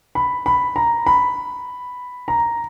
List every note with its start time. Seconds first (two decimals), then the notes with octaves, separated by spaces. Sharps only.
0.15 B5
0.46 B5
0.76 A#5
1.07 B5
2.28 A#5